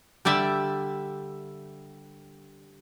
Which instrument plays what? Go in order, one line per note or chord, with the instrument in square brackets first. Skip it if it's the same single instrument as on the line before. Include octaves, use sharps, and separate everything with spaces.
[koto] D3 G3 D5 E5